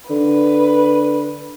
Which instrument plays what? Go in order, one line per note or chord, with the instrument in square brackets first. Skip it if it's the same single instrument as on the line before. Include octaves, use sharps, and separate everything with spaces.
[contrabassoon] D3 [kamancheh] B4